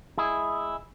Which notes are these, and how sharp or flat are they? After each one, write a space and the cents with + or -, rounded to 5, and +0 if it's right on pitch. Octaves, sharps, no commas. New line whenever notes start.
G#3 +0 E4 +0 G#4 +0